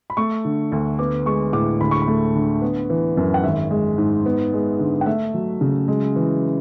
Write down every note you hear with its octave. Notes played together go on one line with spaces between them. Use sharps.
B5
A3 C#6
D3
D2
B3 D6
G#3 C#6
A2 D6
D2 B5
C#6
B5
A3
D3
B3
E3
F#2
F#5
G#1 E5
G#3
G#2
B3
G#3
D3
F#5
A3 E5
F#3
C#3
G#3
E3